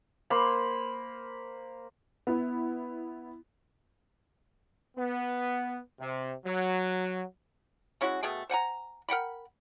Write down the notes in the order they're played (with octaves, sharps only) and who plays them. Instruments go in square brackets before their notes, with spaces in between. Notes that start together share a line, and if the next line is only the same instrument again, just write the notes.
[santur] A#3 C5 B5
[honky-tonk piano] B3 E4
[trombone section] B3
C3
F#3
[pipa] G#3 C#4 E4 F#4
B2 A3 G#4 G5
C5 F#5 G#5 A#5
A#4 F#5 G5 B5